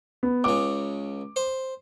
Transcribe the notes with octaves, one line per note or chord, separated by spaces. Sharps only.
B3
C#2 C#3 D6
C5